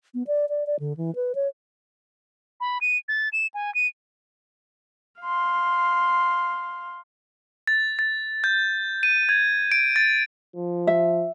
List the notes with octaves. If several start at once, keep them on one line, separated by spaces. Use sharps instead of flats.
B3
D5
D5
D5
D3
E3
B4
C#5
B5
D#7
A6
E7
G#5
D#7
F5 C6
A6
A6
G6
D#7
G#6
D7
A6
F3
E5